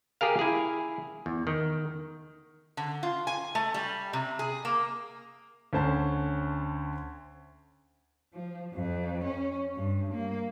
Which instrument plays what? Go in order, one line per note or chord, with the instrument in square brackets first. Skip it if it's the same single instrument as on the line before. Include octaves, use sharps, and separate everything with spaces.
[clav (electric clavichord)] G4 G#4 A#4 F5
E4 G#4
E2
D#3
[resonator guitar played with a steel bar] D3
F4
G#5
A3
G3
C3
G#4
A#3
[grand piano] D2 C#4 C5 A5
[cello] F3
F2
C#4
G2
A#3